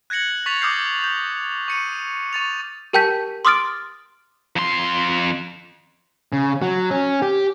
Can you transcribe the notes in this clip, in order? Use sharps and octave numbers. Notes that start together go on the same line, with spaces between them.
F#6 G#6 A#6 C#7 F#7
C#6 A6 B6 F7
D6 D#6 F6 G6 C7
G6
C#6 C#7 D#7
C#6 A6 F7
G4 A#4 G5 A5 G6 B6
C6 D6 D#6 F6 A6 D7
F2 C6
C#3
F#3
C#4
G4